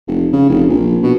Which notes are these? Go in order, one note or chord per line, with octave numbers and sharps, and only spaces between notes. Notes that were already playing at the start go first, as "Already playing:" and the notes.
F1
C#3
F1
A#1
B2